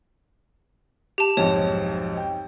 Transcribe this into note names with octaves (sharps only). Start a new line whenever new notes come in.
G4 A5
B1 F2 G#2 C#5
G5